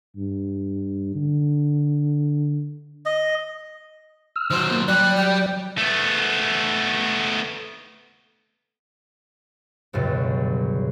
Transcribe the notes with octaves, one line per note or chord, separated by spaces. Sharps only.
G2
D3
D#5
E6 F6
D#3 F#3 C5
A#3
F#3 G3 G4 D5 F#6
G5
A3 B3
G1 C#2 F#2 B2 G3